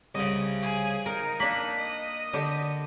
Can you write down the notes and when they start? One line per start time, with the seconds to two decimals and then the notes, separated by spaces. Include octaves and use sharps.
0.15 C2 C#3 D#5
0.62 G#4
1.06 D#4 A#4
1.40 A#3 D4 B5
1.79 D#5
2.33 D3 G4